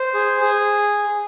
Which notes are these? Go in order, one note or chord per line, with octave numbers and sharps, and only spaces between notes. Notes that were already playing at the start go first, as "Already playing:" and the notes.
Already playing: C5
G#4
G#4